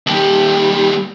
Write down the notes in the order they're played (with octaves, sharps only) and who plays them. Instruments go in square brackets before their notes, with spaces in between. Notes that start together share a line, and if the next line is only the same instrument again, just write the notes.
[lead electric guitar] D#2 G3